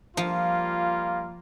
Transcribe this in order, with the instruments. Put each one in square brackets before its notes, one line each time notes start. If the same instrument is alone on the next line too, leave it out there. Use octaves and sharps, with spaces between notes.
[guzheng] F3 [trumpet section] G3 A#3 F4